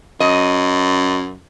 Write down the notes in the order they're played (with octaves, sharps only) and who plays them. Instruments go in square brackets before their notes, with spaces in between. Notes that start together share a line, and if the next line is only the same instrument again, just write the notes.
[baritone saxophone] F#2 [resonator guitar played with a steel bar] D#5